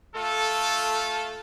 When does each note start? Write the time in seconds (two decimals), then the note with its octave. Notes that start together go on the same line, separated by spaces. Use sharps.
0.15 A3 F4 A4